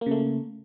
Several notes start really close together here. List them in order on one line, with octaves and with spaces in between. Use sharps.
A#3 C#3 A3